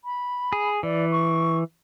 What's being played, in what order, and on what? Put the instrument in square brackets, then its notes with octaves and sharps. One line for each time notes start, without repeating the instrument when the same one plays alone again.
[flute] B5
[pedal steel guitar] G#4
[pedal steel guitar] E3 [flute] D5
[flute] C#6